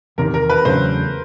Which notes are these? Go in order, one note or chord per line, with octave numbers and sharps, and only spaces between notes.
E2 C3 D#3 A#4
A#4
B4
E2 C#3 F#3 A3 D4 C5